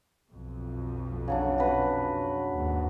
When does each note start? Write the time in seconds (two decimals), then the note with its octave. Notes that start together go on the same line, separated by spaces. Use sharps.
0.32 B1 F2
1.28 C#3 F#3 D4
1.58 F#4 B4
2.53 D#2 G#2